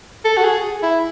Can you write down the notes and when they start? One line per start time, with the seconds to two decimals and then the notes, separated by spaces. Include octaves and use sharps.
0.25 A4
0.37 F#4
0.44 G#4
0.83 E4